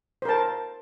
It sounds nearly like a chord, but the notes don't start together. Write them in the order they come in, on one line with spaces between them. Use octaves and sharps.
C5 A#4 A5